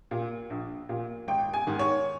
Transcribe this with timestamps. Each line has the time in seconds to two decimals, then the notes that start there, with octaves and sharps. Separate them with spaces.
0.11 A#2
0.50 A#1
0.89 A#2
1.28 G#1 G5
1.53 G#5
1.67 G#2 D#3
1.79 C#5